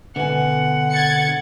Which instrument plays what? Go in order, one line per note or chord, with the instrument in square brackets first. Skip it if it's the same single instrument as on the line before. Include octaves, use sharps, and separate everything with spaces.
[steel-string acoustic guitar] B2 G#5 [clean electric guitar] D3 [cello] F#5
[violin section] G#6 A6 C#7